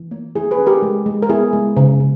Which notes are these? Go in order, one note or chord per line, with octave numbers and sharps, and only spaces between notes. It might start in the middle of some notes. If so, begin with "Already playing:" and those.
Already playing: E3
A#3
A#3 E4 G#4
G#4 B4
C#4
G4 A#4
G#3
G#3
A#4
B3 E4 G#4
G#3
C#3
C#3